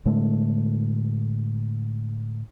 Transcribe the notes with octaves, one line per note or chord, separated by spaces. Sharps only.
A2 D3 G#3 A3